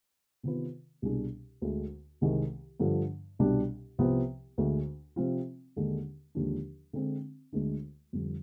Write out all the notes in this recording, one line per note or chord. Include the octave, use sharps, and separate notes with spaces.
C3 D#3 B3 F4 B4
C2 B2 G3 D4 G#4
D2 D3 G#3
C2 C3 D#3 G#3
G2 D3 F3
C2 B2 G3 D4
C2 C3 F3 B3
D2 D3 G#3
C3 F3 C4 F4
D#2 D3 G#3
D#2 D3 F3 G#3 D4
D3 G#3 C4
D2 D3 G#3 D4
F2 D3 G3